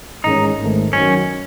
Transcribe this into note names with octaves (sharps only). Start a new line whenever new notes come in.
A1 G#2 D#3 G#3 C#4 D#4
G#1 G#2 D#3 A3
F#2 D#3 F#3 C#4